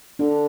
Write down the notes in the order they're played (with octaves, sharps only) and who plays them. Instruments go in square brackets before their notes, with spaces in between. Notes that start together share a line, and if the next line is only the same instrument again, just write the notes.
[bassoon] D3 [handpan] D4